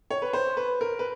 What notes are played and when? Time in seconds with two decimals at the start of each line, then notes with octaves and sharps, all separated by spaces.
0.11 C#5
0.22 B4
0.33 C5
0.57 B4
0.81 A#4
0.99 B4